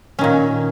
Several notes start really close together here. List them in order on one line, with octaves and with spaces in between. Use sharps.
C#4 D#3 A#2